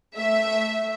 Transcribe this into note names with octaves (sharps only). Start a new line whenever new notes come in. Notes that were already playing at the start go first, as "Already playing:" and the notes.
A3 E5